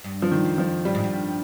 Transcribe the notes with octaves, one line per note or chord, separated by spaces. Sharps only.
G2
F3
D#3
F2
F3
G2 G3
G#2
G2